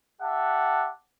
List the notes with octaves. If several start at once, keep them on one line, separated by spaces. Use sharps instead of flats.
G4 E5 F#5 A5